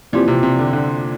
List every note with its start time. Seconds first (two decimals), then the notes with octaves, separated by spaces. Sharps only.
0.13 A#2 E3 F3 C4 G4
0.28 C3
0.43 C3
0.59 D3
0.73 D3